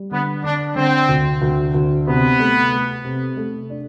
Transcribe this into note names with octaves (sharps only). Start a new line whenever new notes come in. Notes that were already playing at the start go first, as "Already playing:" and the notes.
Already playing: G3
D3 B3
D3 D4
D3 C4
D2
D2
D2
C3 B3
A3
A3
C3
A3
D4